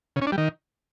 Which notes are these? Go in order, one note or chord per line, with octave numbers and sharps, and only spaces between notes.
C#3
C#4
D4
G3
D#3